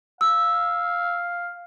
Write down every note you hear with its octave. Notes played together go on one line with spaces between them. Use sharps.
F5 E6